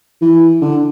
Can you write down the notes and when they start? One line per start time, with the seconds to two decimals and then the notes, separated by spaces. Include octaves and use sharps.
0.22 E3
0.62 D3